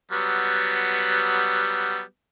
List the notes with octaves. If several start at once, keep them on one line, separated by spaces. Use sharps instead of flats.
F#3 G3 B3